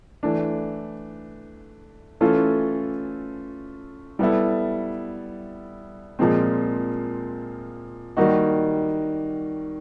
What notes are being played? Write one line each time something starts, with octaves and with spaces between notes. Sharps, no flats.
E3 A3 D4
E3 A3 C#4 F4 A4
G3 B3 E4 A4
A#2 F3 G#3 C4
D#3 G3 A#3 D#4 F#4